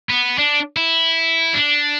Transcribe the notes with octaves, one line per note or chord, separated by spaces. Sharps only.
B3
D4
E4
D4